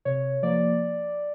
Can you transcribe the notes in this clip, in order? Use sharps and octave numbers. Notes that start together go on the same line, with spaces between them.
C3 C#5
F3 A#3 D5